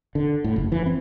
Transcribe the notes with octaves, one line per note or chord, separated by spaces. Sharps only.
D3
A2
F#1
E3
C4